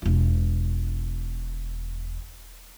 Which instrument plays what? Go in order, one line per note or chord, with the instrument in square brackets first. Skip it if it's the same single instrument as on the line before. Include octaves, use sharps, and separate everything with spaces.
[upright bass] E1 F4